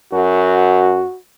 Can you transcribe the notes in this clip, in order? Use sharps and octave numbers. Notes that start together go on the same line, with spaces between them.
F#2 F#4